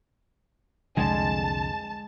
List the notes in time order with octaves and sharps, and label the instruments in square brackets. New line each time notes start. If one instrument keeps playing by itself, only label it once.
[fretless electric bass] C2 F2 D3 [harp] G#3 [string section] A5